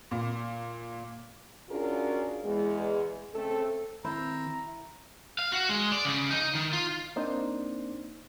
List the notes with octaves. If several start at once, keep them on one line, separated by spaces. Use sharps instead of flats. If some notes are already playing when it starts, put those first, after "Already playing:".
A#2
C#4 D4 F4 F#4 G#4 A#4
E2 G#3
C#3 A3 C4 A4
D#3 C4 E4 C5 A#5
F5
F#4
G#3
D5
C#3
D#4
D#3
F4
A#3 C4 D4 D#4 C5